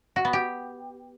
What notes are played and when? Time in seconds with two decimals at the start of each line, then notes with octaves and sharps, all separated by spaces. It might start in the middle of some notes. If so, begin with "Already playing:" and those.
0.16 F#4
0.25 B3
0.33 G4